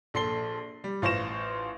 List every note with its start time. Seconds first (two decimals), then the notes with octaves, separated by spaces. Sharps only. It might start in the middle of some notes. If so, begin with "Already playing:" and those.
0.14 A#1 A4 C6 C7 G7
0.84 G3
1.02 A1 F4 C5 C#6 A#6 E7